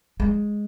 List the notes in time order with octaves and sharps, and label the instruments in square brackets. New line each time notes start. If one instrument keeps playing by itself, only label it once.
[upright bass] G#3